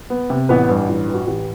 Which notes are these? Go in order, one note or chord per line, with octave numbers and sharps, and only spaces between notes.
B3
C3
A1 B3 B4
G2
A1
E3
F#4
A1 G4